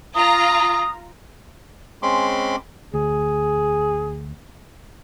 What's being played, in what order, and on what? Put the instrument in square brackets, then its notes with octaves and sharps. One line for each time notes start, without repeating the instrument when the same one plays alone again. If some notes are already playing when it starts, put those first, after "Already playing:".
[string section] F4 A#5 [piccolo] D#6
[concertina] G#3 C4 C#4 B5 C6 D6
[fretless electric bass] D2 [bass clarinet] G#4